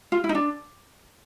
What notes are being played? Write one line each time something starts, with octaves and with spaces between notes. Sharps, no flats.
F4
E4
D#4
D4